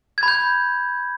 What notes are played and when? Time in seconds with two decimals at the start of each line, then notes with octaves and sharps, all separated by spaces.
0.18 G#6
0.23 B5
0.28 G6